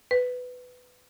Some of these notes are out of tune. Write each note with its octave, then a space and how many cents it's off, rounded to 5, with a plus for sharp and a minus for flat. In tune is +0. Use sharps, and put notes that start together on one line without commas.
B4 +15